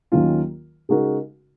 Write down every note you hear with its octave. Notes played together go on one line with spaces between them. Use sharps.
D#2 D#3 F#3 C#4 F4
C#3 G#3 D#4 F#4 A#4